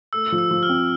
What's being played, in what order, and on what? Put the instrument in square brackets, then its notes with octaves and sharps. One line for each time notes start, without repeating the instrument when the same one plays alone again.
[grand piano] A3 [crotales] E6
[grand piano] F3
[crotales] E6
[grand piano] F3
[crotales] F6
[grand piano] C4